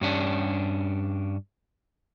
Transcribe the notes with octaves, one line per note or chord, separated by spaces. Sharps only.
G2 C#4 D4